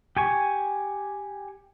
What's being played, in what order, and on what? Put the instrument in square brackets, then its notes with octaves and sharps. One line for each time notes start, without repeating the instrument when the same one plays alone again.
[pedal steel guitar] G4 G#5 C#6